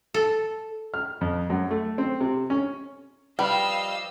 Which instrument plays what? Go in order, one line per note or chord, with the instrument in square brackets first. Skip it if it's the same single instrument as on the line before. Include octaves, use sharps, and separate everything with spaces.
[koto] A4
[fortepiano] F6
F2
F#2
A3
C4
C3
C#4
[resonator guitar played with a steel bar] F3 B4 G5 [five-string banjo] G3 [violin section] D#5 F5 E6